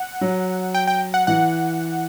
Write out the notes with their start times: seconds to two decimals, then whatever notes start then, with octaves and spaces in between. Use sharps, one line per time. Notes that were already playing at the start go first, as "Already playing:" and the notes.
Already playing: F#5
0.21 F#3
0.74 G5
0.87 G5
1.14 F#5
1.27 E3 F#5